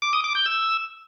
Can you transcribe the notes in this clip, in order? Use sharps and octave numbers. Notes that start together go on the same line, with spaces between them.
D6
D#6
D6
G6
E6